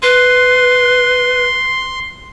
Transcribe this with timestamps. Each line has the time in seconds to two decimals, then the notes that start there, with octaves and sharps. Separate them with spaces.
0.03 B4 C6